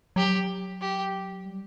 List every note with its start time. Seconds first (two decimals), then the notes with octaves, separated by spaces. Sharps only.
0.16 F#3 G4
0.81 G4
1.45 G3